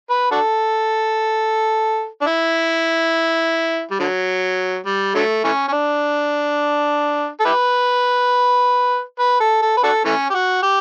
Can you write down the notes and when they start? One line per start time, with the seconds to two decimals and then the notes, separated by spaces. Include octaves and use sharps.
0.10 B4
0.31 D4 F#4 A4
2.21 D4
2.27 E4
3.91 G3
3.99 D3 F#3
4.86 G3
5.15 D3 F#3 A3
5.44 E3 A3 C#4
5.68 C#4
5.72 D4
7.40 A4
7.45 E4 G4 B4
9.19 B4
9.40 A4
9.62 A4
9.77 B4
9.83 D4 F#4 A4
10.05 E3 A3 C#4
10.30 G4
10.34 F#4
10.63 G4